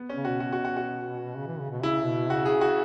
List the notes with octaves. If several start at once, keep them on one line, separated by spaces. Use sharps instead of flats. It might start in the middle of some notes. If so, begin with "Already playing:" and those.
Already playing: B3
C#4
C#3
B2 F#4
F#4
F#4
F#4
F#4
C#3
E3
C#3
B2
C#3 E4
B2
C#3 F#4
G#4
F#4